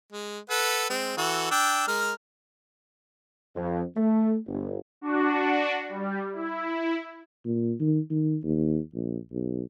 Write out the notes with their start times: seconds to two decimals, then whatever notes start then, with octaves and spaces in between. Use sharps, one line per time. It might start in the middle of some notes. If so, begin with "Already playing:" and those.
0.12 G#3
0.50 A4 B4 F#5
0.90 G#3 C4
1.17 E3 F#4 A4
1.51 D4 G5 E6
1.88 G#3 A#4 F6
3.56 F2
3.96 A3
4.47 G1
5.01 D4 F#4
5.88 G3
6.33 E4
7.45 A#2
7.80 D#3
8.10 D#3
8.44 D#2
8.94 A#1
9.32 B1